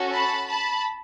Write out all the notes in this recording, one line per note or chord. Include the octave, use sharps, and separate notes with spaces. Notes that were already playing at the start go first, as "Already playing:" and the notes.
Already playing: C#4 F#4 A4
A5 B5
A5 B5